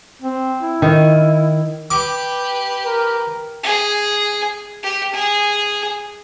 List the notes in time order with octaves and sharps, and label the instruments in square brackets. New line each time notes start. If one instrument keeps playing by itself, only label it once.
[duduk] C4
E4
[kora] D#3
[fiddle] G4 B4 [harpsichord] D6
[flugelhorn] A#4
[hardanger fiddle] G#4
G4
G#4